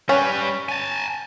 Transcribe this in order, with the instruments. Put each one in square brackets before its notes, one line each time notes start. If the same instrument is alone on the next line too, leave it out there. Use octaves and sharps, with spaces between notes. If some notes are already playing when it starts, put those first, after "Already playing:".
[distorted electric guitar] G3 B4 [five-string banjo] C#4
[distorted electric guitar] G#5 A5